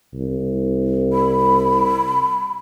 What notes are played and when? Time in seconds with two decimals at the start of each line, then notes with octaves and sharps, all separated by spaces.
0.14 C2
1.13 B5